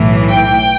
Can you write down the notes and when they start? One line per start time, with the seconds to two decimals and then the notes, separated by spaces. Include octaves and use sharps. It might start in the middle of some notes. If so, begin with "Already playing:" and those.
Already playing: B1 A2 E3
0.29 G5